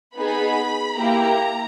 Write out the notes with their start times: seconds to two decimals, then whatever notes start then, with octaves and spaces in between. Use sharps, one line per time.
0.15 B3 D#4 G#4 B5
0.97 A#3 E4 G4 A#5